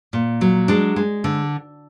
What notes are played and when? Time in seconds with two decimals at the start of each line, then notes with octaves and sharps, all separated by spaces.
0.13 A#2
0.41 F#3
0.68 G#3 D4
0.96 G#3
1.24 D3